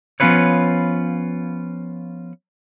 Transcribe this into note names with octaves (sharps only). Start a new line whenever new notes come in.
F3 B3 C#4 F4 B4 C#5